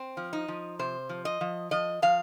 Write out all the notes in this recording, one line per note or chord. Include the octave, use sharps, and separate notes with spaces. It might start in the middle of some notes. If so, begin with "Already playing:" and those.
Already playing: C4
F3
D#4
F3
C3 C5
F3
D#5
F3
F3 D#5
F3 F5